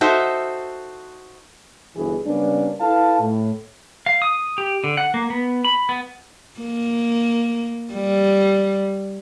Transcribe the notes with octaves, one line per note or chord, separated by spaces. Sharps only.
D#4 F#4 A4 C5 E5
G1 B2 E3 G#4
C#3 G3 A#3 B3 C#4 D4
E4 A4 B4 F5 A5
A2
F5
D#6
G4
D3
F#5
A#3
B3
B5
B3
A#3
G3